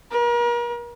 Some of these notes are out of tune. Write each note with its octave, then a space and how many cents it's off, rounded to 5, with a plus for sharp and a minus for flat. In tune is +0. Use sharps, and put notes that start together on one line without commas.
A#4 +40